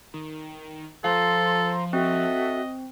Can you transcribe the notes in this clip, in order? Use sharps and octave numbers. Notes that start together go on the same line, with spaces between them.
D#3
F3 A4 C5 F5 A#5 C6
C4 F#4 A4 D#5 E5